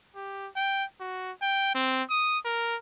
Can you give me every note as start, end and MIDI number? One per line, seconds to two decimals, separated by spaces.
0.15 0.48 67
0.56 0.84 79
1.01 1.32 66
1.42 1.71 79
1.75 2.03 60
2.10 2.38 87
2.45 2.76 70